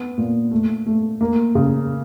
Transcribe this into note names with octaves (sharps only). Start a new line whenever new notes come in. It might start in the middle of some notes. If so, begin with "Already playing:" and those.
Already playing: B3
A#2
A3
A3
A#3
C#3